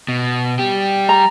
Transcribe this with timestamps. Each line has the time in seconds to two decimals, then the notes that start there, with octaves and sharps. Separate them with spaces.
0.08 B2
0.59 G3 G4
1.09 A#5